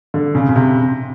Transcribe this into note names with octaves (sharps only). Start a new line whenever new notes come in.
D3
C#3
C#3
C3